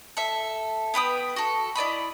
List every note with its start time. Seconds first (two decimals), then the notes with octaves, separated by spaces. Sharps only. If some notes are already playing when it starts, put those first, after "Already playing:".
0.17 A4 E5
0.94 B3 B4 G5 D#6
1.36 F#4 A4
1.75 E4 D5 D#5 B5